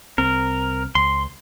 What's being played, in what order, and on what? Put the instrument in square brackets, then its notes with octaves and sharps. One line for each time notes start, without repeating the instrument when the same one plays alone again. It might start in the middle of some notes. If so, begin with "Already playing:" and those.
[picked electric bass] C2 C4 [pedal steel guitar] A#4
[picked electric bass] C#2 [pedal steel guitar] C6